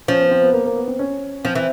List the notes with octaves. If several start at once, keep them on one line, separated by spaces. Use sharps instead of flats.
F3 C#4
B3
C4
B3
A#3
A#3
B3
C4
C#4
F3 C4
E3